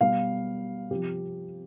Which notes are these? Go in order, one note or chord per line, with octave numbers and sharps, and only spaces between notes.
B2 G3 F5
C3 F3 G4